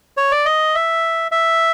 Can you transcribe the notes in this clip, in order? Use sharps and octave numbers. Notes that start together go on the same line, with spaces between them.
C#5
D5
D#5
E5
E5